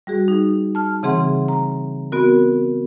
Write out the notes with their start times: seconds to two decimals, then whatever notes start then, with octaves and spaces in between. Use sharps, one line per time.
0.07 G3 F#4 G#4
0.28 D#4
0.75 A5 F6
1.03 C#3 E3 C4 G#4 F#5 C6
1.48 A#5
2.12 B3 C4 F#4 A#4